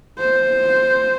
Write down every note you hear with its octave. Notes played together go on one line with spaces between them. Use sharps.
C5